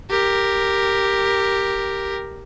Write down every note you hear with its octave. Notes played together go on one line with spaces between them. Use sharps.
G4 A#4